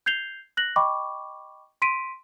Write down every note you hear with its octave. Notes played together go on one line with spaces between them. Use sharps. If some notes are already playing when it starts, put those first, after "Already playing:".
G6 G#6 C7 F7 G7
F#6 A#6 F#7
D#5 G5 B5 C#6 D6
C6 B6 D7 D#7